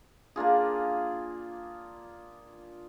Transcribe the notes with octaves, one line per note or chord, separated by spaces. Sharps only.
A#3 D4 F4 G#4